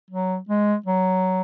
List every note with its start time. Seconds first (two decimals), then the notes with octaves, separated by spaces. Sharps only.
0.11 F#3
0.49 G#3
0.86 F#3